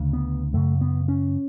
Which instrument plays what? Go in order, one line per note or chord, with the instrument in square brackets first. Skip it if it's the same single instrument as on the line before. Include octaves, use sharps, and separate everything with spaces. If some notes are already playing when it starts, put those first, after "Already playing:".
Already playing: [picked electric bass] D2 C#3
B3
F#2 C#3 A3
B3
C#4